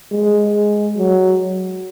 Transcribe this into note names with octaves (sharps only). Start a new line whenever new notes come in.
G#3
F#3